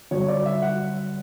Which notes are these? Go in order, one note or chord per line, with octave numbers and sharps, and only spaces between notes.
G1 G2 F#3 C#5
D5
E5
F#5